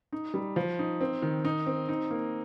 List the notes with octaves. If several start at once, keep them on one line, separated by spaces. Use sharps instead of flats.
D#4
G3
F3
D#4
C4
D#3
D#4
C4
D#4
A#3